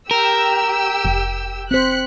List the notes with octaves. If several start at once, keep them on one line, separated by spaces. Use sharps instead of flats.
G4 A#4 G5 E6
F1
C4 C5 F#6 B6 C#7